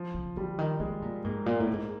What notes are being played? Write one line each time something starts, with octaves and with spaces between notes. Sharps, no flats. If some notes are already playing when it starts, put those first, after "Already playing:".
Already playing: F3
C#3
D3 G3
D#3
D#3 G#3
A#2
G#2 A#3
A#2
A2
A#3
G#2